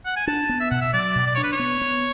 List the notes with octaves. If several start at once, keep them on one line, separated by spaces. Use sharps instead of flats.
F#5
G#5
D4 A5
B3
E5
B2 F#5
E5
F#3 D5
B2
D5
D4 C#5
B4
C#5
B3
B3